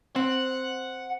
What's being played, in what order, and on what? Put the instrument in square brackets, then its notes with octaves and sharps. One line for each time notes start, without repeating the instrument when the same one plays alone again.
[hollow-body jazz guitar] C4 [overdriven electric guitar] F#5